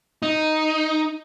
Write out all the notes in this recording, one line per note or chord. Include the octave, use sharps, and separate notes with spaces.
D#4